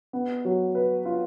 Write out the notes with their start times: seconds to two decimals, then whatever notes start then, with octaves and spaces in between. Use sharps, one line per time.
0.13 B3
0.45 F#3
0.75 B4
1.05 F4